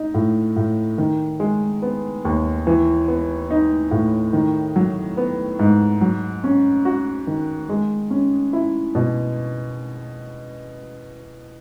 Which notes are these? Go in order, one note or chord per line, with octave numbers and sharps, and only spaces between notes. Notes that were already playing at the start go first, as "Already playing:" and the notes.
Already playing: D#4
A2
A2
D#3
G#3
B3
D#2
E3
B3
D#4
A2
D#3
F#3
B3
G#2
F#3
C#4
F#4
D#3
G#3
C#4
E4
B2